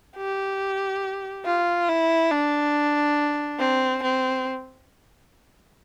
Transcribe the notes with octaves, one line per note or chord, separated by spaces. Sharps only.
G4
F4
E4
D4
C4
C4